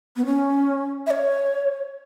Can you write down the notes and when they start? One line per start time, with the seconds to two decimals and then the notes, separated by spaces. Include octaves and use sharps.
0.16 B3
0.26 C#4
1.07 E5
1.11 C#5